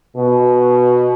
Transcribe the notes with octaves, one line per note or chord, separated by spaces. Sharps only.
B2